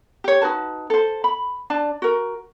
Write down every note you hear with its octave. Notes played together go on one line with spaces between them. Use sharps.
G4 C#5
D#4 F#4 B4 A5
A4 C5
B5
D4 D5 A5
F#4 A#4